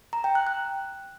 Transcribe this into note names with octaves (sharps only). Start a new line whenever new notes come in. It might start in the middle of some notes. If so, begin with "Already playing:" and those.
A#5
G5
F#6
F#6